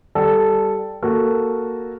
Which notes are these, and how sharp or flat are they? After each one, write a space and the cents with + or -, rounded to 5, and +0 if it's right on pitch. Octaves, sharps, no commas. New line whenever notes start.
G3 +0 A4 +0 D5 +0
A#3 +0 F#4 +0 A4 +0